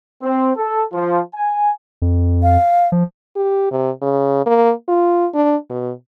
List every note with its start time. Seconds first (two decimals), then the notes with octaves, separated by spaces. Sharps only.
0.22 C4
0.56 A4
0.93 F3
1.34 G#5
2.02 F2
2.43 F5
2.92 F3
3.36 G4
3.71 C3
4.02 C#3
4.46 A#3
4.88 F4
5.34 D4
5.70 B2